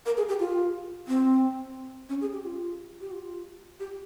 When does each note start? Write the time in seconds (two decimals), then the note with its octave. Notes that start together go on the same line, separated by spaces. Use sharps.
0.06 A#4
0.17 G#4
0.29 G4
0.40 F4
1.08 C4
2.09 C#4
2.21 G#4
2.33 G4
2.44 F4
3.01 G4
3.12 F4
3.80 G4